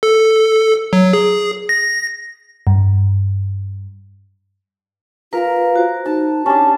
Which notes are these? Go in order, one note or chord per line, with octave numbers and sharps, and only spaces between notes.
A4
F#3
G#4
A#6
G2
F4 A#4 B4 F5 A#5
F#4 C5
D#4 A5
C#4 D4 G4 A5